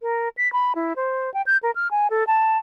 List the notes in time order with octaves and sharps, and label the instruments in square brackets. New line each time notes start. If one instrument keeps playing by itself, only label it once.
[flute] A#4
B6
B5
E4
C5
G5
G6
A#4
F6
G#5
A4
A5